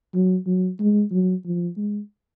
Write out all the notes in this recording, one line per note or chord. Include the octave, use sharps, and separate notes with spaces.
F#3
F#3
G#3
F#3
F3
G#3